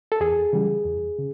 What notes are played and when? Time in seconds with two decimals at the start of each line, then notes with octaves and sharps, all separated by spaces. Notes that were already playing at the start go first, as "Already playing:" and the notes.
0.12 A4
0.20 E2 G#4
0.53 C#3 E3 G3
0.85 E2
1.19 C#3